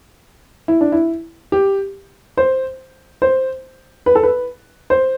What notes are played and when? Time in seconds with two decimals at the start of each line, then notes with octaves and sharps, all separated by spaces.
0.68 E4
0.81 D4
0.92 E4
1.52 G4
2.37 C5
3.22 C5
4.06 B4
4.15 A4
4.23 B4
4.90 C5